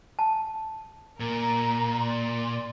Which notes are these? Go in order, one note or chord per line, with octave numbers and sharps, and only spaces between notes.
A5
A#2 A#4 A#5
D5 C6